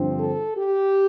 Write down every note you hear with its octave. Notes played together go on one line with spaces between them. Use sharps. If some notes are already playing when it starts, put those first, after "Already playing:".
Already playing: G2 D3 F3 C4
A4
G4